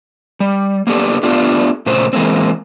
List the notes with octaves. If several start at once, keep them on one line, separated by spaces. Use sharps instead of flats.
G3
A#3 B3 D4 G4 A4
A3 B3 D4 F4 G4
A#2 C#3 A3 C5
E3 G#3 A#3 C4